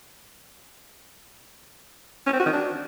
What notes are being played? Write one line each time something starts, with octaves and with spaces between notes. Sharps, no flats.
C#4
C4
F#4
D#3
D4